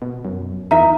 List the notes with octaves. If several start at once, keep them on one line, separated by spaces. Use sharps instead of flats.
B2
F#2
E2 D#4 F4 E5 A#5